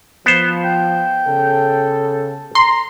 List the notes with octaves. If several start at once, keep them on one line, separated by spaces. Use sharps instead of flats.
F3 B3 C5
G5
C#3 A4
A#5 C6